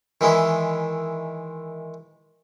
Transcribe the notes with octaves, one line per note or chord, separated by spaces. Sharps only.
D#3 E3 G#3 E4